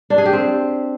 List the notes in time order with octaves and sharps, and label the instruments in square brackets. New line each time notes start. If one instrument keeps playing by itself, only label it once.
[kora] D4
G#4
G4
C4